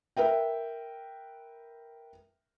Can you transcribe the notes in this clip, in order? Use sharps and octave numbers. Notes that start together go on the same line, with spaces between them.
A#4 B4 E5 G5